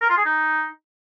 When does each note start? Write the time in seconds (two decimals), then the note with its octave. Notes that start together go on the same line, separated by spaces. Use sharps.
0.02 A#4
0.10 F4
0.18 G#4
0.26 D#4